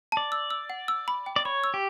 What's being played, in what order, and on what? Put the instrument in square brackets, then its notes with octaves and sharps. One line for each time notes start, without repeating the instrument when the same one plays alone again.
[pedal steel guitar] D5 [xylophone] A5
[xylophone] E6
E6
F#5
E6
B5
G5
[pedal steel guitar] D5
[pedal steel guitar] C#5 [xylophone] B5
[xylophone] E6
[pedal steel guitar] G4